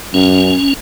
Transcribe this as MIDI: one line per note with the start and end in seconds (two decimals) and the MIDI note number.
0.14 0.54 42
0.14 0.73 61